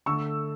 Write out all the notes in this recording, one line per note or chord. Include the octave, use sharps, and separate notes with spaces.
D3 A3 C#6 E6